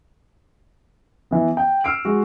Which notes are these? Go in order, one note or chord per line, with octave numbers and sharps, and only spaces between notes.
E3 B3
G5
E6 F6 C7 D7
G#3 F#4